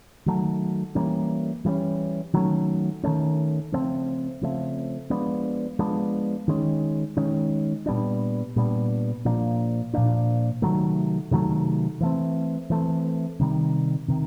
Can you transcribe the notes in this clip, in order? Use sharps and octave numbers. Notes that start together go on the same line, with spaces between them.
D#3 F#3 A3
E3 G3 A#3 C#4
E3 G3 A#3 C#4
D#3 F#3 A3 C#4
D#3 F#3 A3 C#4
C#3 F3 A3 C4
C#3 F3 A3 C4
F3 G#3 B3 D4
F3 G#3 B3 D4
D#3 G#3 C#4
D#3 G#3 C#4
A#2 G3 B3 D4
A#2 G3 B3 D4
A#2 F3 A#3 D4
A#2 F3 A#3 D4
C3 D#3 F#3 A3
C3 D#3 F#3 A3
E3 A3 C4
E3 A3 C4
C3 D#3 G3
C3 D#3